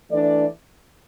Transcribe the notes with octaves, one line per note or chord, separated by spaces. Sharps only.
E3 A3 D4 D5